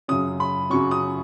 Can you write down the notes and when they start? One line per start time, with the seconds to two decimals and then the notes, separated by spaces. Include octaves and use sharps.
0.08 F#2 C#3 F#3 C#4 D#6
0.40 B5
0.70 F#2 C#3 F#3 C#4 C#6
0.91 D#6